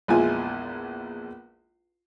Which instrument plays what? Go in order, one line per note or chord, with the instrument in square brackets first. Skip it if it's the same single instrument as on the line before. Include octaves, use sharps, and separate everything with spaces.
[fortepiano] A#1 E2 G#3 E4 F4 G#5